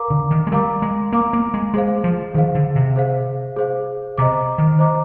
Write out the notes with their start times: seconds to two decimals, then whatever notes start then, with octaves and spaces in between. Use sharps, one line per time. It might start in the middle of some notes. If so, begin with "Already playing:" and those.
Already playing: A#4 F5 A#5 D6
0.10 D3
0.31 D#3
0.47 G#3
0.52 G3 A#4 F5 A#5 D6
0.82 G#3
1.12 A#3 A#4 F5 A#5 D6
1.33 A#3
1.54 G#3
1.74 G#3 G#4 C5 F5
2.04 F3
2.34 D#3 G#4 C5 F5
2.55 D3
2.76 C3
2.96 G#4 C5 F5
3.56 G#4 C5 F5
4.18 C3 C5 D#5 A#5 D6
4.58 D#3
4.79 C5 D#5 A#5 D6